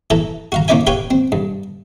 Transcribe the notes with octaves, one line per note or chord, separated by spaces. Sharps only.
E3 A4 A#5
F#4 F5 A#5
A#3 C#4 E4 D5 E5 G#5
G4 B4 C#5 F5 G5 G#5
C4
G2